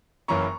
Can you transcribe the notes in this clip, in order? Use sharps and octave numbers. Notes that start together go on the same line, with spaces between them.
F#1 F#2 E3 A#3 C#4 A#5 C#6